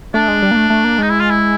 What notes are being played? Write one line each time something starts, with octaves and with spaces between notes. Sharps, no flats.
A3 D4
G#3
G3
A#3
A3
A3
A#3
G#3 D#4
E4
F4
E4